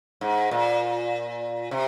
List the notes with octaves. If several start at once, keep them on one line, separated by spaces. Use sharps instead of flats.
G#2
A#2
C3